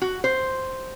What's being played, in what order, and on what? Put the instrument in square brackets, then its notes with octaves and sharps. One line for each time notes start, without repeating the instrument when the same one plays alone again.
[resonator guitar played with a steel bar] F#4
C5